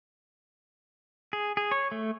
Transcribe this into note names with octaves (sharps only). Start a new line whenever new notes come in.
G#4
G#4
C#5
A3